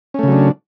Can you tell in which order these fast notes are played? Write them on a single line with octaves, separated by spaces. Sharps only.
C#4 A3 C#3 F#3 D4